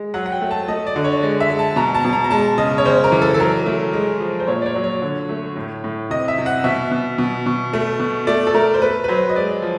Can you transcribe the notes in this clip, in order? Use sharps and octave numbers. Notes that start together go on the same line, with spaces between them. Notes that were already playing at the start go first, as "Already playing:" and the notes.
Already playing: G#3
F#3 F#5
F#5
G5
A3
A5
A3 D#5
D5
D3
C#5
G#3 D5
E5
G#3
A5
B2 A#5
A5
B2
A#5
A#5
G#3 A5
C#3 D#5
C#5
C#3 C5
A#4
E3
A4
A4
F#3 A#4
A3
G#3
F3
C5
A#2 C#5
D5
C#5
F#3
C#5
D3
A3
A2
A2
C3 D#5
E5
C3
F#5
B2 E5
B2
B2
B2
A3
B2
A3 D5
A4
A3 A#4
C5
A3 B4
B4
F#3 C5
D#5
G#3 D5
F3